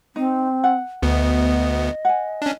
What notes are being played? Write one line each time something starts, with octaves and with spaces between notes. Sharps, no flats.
C4 D#4
F#5
D2 B3 D#5
F#5 G#5
C#4 D4